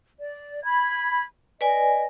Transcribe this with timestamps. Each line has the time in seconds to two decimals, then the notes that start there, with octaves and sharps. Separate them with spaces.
0.19 D5
0.63 B5 G#6
1.61 B4 D5 D#5 G#5